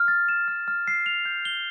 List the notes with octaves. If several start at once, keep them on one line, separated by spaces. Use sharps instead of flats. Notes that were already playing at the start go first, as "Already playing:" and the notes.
Already playing: F6
A6
E7
F6
F6
C7
F7
G6
G7